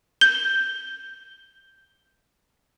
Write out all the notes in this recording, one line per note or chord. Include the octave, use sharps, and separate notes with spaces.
G6 G7